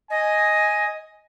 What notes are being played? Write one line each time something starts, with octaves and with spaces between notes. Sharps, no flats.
D#5 G#5